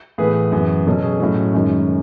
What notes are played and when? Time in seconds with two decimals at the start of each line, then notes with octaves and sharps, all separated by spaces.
0.18 A2 E3 B3 G#4 B4
0.52 F#2 E3 B3
0.87 B2 F#3 C#4 A4
1.03 G#4
1.20 A2 F#3 C#4
1.54 F#2 D#3 G#3 C#4